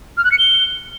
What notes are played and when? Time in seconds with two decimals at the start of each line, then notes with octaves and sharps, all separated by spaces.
0.17 F6
0.24 F#6
0.31 C#7
0.38 G7